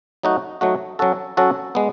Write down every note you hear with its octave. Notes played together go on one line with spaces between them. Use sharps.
F#3 A3 D#4 F#4
F#3 A3 D#4 F#4
F#3 C#4 F#4 A4
F#3 C#4 F#4 A4
G#3 B3